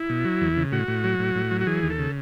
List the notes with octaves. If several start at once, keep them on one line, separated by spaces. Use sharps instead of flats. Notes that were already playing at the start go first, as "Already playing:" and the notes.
Already playing: E4
B2
F#3
E2
C#3
A2 F#4
A2
F#3
A2
A2
F#3
F#4
E3 G#4
D#2
A4
C#3